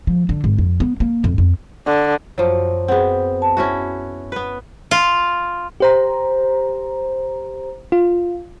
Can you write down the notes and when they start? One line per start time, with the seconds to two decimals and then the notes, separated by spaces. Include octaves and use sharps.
0.07 F3
0.29 D3
0.44 G#1
0.58 F2
0.80 B3
1.00 A#3
1.24 F2
1.38 F2
1.87 D3
2.38 F#2 F3 F#3
2.88 B3 C4 G#4 F#5
3.42 A5
3.57 C#4 E4 F#4
4.32 B3 B4
4.91 F4
5.80 G4 C5 A#5
7.92 F4